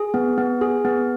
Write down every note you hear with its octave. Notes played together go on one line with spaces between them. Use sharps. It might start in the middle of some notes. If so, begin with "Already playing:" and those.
Already playing: G#4
B3
B3
G#4
B3